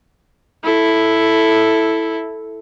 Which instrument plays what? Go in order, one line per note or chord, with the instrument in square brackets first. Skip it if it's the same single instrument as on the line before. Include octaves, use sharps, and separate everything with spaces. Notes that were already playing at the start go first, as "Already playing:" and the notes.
[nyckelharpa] E4 A4